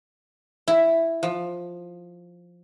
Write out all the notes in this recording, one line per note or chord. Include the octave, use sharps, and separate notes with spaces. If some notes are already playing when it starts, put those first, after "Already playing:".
E4
F3